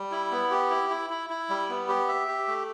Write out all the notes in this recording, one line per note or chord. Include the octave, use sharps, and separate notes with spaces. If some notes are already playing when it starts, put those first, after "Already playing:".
Already playing: G3
E4
B3
G4
E4
E4
E4
E4
G3
B3
G4
E5
G4
A3